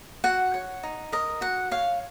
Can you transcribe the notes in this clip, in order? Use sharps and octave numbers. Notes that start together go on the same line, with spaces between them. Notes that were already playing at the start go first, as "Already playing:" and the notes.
F#4 F#5
C#5
D#4
A#4 D#5
F#4 F#5
C#5 F5